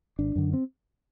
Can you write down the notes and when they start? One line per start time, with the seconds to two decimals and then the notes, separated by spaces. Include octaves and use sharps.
0.19 G#1 D4
0.36 F#2 D3
0.53 C4